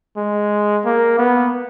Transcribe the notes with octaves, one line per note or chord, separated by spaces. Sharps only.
G#3
A#3
B3